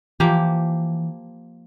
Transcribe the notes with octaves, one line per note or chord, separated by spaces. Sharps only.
E3 F3 A#3 G4